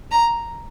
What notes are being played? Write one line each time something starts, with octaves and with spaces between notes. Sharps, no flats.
A#5